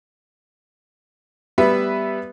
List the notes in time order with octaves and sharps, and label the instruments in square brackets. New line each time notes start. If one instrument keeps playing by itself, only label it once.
[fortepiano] G3 B3 B4 E5